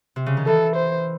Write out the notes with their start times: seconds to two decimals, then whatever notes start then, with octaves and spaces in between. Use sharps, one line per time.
0.16 C3
0.26 C#3
0.37 D#3
0.46 E3 A4
0.76 C5